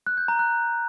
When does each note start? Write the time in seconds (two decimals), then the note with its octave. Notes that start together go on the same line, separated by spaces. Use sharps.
0.07 F#6
0.17 G6
0.28 A#5
0.39 F#6